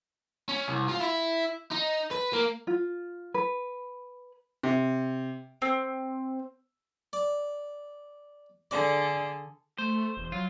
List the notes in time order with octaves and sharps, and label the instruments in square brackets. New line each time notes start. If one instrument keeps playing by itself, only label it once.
[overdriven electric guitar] C#4
C2
F4
E4
D#4
B4
A#3
[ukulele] F4
B4
[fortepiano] C3
[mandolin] C4
[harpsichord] D5
[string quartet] D3 G#4 A4 [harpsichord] D5
[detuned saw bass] A3 [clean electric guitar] C5
[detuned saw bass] E1
[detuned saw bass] F#3 [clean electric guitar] F4